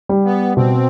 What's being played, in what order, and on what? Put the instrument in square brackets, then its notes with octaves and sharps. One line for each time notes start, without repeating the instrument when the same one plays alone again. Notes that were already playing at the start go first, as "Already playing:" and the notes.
[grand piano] G3
[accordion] B3
[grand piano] B2 [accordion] C4